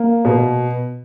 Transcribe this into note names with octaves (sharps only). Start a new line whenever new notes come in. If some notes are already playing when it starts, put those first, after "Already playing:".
Already playing: A#3
B2